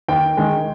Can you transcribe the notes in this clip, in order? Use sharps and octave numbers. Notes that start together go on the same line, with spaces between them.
D#2 G5
D#3 G#3